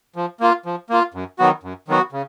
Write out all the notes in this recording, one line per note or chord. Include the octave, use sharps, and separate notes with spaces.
F3
A#3 F4
F3
A#3 F4
F#2
D#3 F#3 B3 F#4
F#2
D#3 F#3 B3 F#4
C#3